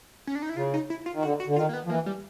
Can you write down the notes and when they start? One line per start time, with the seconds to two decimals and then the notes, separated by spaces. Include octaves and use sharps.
0.27 C#4
0.35 D4
0.42 D#4
0.49 E4
0.56 C#3 F4
0.74 D#4
0.90 E4
1.06 F4
1.13 D#3
1.23 D3 F#4
1.40 F#4
1.47 D3
1.56 D#3 F4
1.69 A#3
1.73 B3
1.85 F3
1.89 E3 A#3
2.06 G3